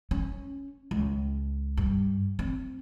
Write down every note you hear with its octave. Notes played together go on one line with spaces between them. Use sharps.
C#4
C#2
G2
C4